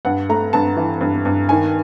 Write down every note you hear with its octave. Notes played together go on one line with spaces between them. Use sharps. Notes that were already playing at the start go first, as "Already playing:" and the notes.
G2 F#5
A3 A#5
G2 A5
E3
G2
G2
D#3 G#5